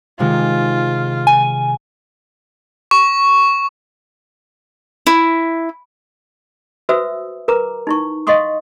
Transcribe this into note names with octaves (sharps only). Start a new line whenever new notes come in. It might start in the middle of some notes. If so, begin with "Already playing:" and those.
C3 D#3 G#3 F4
G#5
C#6
E4
F#4 B4 C5 E5 D#6 E6
A#4 B4 A#5 D6
D#4 E4 C#6
D#5 F5 F#5 C6 C#6 D#6